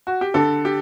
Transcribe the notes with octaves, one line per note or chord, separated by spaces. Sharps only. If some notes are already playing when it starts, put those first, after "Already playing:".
F#4
G4
D3 A4
G4